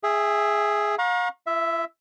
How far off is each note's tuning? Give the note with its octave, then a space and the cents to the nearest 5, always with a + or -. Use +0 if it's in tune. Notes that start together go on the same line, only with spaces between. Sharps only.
G#4 +0 E5 +0 G5 +35
F5 +45 A#5 +30 C#6 -30
E4 +45 E5 +0